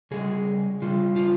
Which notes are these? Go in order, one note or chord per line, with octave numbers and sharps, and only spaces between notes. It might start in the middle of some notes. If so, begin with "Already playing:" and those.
C#3 G3 G#4
C#3 G3 F4
F4